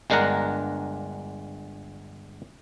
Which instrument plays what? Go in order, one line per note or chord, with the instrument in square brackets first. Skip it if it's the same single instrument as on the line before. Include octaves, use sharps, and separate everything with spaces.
[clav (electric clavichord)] G1 G#3 D4 A#4 F#5 A#5